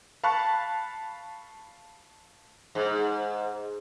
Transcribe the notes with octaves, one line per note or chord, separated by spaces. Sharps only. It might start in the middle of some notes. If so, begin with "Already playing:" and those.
F5 A5 B5 C#6 F#6
G#2